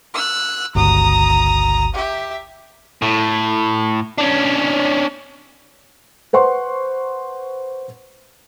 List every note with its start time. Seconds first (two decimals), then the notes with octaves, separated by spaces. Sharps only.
0.14 E6 F#6
0.75 G1 C#2 F#4 A#5 D#6
1.95 G4 E5
3.02 A2
4.18 C#4 D4
6.33 B4 C5 F#5 C6 C#6